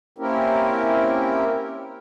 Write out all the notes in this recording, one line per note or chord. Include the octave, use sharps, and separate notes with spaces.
A#3 C4 C#4 E4 G4 A#4